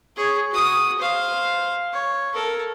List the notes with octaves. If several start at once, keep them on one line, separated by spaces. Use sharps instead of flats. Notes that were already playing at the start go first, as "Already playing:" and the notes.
G#4 C#5
F#4 D#6
C5 F5
C#5
A4 A#4